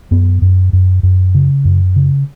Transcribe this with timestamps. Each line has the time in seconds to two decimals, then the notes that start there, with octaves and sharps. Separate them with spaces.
0.11 F#2 B3
0.42 F#2
0.73 F#2
1.03 F#2
1.35 C#3
1.65 F#2
1.96 C#3